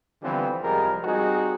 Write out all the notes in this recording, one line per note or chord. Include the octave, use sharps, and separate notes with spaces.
D3 E3 F3 G3 B3 C4
C2 F3 G3 G#3 G#4 A#4
G3 C4 D#4 F#4 G#4